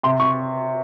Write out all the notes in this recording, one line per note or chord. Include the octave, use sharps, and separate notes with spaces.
C3 C6
C#6